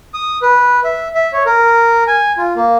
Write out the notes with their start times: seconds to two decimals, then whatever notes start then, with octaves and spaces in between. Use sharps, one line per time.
0.14 D#6
0.42 B4
0.84 E5
1.15 E5
1.33 C#5
1.46 A#4
2.07 G#5
2.37 F4
2.56 A#3